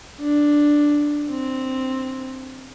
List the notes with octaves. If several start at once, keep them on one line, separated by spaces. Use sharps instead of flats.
D4
C4